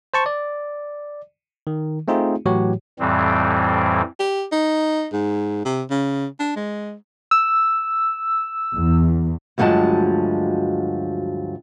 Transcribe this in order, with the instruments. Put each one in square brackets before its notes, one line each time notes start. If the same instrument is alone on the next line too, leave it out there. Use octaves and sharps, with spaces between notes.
[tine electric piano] C5 A5 C#6
D5
D#3
A3 C4 D#4 F4 G#4
A2 E3 F#3 F#4 G4 C#5
[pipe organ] F2 A2 E3 G3 C4
[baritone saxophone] G4
D#4
G#2
C3
C#3
D4
G#3
[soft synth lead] E6
[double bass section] E2
[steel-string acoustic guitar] D2 G2 F3 F#3 G#3 A5